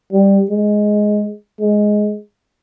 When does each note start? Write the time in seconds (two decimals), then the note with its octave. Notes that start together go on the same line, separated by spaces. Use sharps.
0.13 G3
0.50 G#3
1.61 G#3